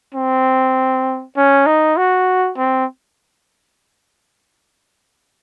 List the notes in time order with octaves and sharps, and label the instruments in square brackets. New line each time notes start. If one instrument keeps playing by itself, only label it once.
[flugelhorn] C4
C#4
D#4
F#4
C4